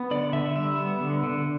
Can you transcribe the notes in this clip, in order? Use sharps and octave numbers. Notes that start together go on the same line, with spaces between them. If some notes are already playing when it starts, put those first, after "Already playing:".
Already playing: B3
D3 D5
D3 E5
G3 E5
B3
D3
D3